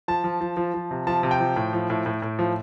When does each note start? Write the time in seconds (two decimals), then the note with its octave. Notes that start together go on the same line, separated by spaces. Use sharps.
0.08 F3 A5
0.24 F3
0.41 F3
0.57 F3
0.74 F3
0.91 C3
1.07 F3 A5
1.23 C3
1.31 G5
1.40 F3
1.56 A2
1.73 F3
1.90 A2
2.06 A2
2.22 A2
2.39 F3